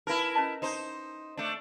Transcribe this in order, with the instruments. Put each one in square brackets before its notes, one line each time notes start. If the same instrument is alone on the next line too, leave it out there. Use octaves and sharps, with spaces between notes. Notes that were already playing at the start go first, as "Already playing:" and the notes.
[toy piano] D#4 B4 [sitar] E4 A#4
[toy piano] C#4 D#5 A5
[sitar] D#4 C5
A3 D4